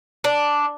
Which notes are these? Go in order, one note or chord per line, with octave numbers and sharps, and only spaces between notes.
D4